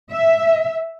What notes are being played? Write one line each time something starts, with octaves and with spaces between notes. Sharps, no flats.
E5